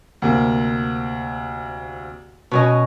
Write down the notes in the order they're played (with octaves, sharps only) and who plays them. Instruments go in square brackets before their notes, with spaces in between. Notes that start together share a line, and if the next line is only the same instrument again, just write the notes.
[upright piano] D2 C3 A#3
[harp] B2 C#4 D#5